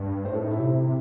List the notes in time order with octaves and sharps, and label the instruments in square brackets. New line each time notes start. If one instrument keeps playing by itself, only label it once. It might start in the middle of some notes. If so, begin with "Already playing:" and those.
Already playing: [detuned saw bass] G2
[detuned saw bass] A2 [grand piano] C5
[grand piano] A4
D#4
E4
[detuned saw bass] C3
C3